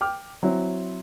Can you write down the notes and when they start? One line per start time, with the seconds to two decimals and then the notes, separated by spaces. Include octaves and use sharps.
0.01 G5 D6 F6
0.43 F#3 C4 E4